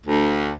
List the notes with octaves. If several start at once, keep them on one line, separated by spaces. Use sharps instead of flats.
D2